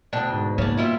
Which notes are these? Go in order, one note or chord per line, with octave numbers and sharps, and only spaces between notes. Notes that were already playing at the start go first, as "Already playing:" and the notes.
D2 B2 D4 G5
G#2
C#3 A#3 D4
G3 E4 F4